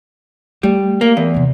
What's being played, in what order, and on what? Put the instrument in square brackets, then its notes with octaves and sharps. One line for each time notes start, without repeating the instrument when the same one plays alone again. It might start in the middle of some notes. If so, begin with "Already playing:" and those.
[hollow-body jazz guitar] G3 [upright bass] A3
[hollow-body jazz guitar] A#3
E2
[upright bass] D#2 C3